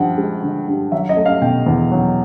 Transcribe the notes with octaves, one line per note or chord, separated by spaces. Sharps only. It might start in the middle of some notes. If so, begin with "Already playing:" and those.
Already playing: G2 F3 F#5 G5
G#3
D3
G2
F#3 E5
D#5
A3
F5
B2 G5
E2
F#3